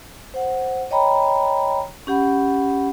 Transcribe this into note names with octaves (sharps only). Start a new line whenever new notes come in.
C5 F#5
C#5 D#5 G5 A#5 B5
C#4 G4 F#5 B5